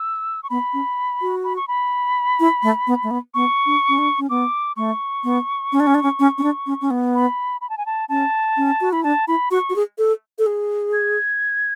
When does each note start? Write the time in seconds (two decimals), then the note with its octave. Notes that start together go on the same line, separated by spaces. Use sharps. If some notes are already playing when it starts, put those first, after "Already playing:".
Already playing: E6
0.43 C#6
0.50 B3 B5
0.73 C#4
1.22 F#4
1.44 B5
1.56 C#6
1.68 B5
2.40 E4
2.63 A3
2.87 B3
3.03 A3
3.11 B3
3.34 B3 C#6
3.66 D4
3.88 C#4
3.98 D4
4.19 C#4
4.30 B3 D6
4.77 A3 C#6
5.24 B3
5.72 C#4
5.80 D4
5.87 C#4
5.94 D4
6.03 C#4
6.19 C#4
6.38 C#4
6.43 D4
6.66 C#4
6.81 C#4
6.90 B3
7.14 B5
7.61 B5
7.70 A5
7.78 G#5
7.86 A5
8.09 C#4 A5
8.57 C#4
8.80 F#4
8.92 E4 B5
9.04 D4 A5
9.28 E4 B5
9.51 F#4 C#6
9.70 F#4
9.76 G#4
9.98 A4
10.39 A4
10.46 G#4
10.93 G#6